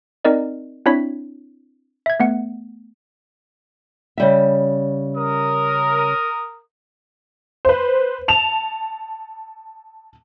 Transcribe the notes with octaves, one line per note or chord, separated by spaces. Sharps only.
C4 D#4 A#4 D5 D#5
C4 D4 E4 C#5 B6
E5 G#6
A3 B3 F#5
C#3 G3 E5
A#4 D#6
B4 C5
A5 E7 F7